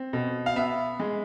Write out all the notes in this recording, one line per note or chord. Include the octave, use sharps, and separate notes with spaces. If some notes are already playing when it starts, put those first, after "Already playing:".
Already playing: C4
B2
F5
B3 E5
G#3